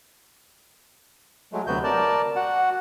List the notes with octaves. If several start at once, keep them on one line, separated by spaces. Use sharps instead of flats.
F#3 G#3 A3
D2 C3 F#3 B3 F#4 G6
A#4 D5 A5
F#4 F#5